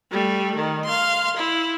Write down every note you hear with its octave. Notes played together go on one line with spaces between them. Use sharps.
G3 A3
D#3
F5 C6
E4